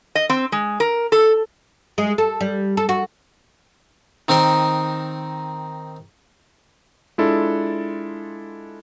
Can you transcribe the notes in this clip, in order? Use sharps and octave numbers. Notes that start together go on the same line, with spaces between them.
D#5
C4
G#3
A#4
A4
G#3
A4
G3
A4
F#4
D#3 C4 D#4 A#4 C6
G#3 D4 E4 F4 A4